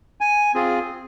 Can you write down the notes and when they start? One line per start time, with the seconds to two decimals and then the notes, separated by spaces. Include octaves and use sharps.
0.21 G#5
0.54 C4 F4 G#4